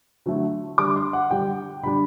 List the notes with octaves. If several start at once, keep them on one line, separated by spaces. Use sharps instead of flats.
D3 F#3 A3 E4
D3 G3 D4 D6
C6
F#5
D3 G3 D4 G5
D3 G3 D4 B5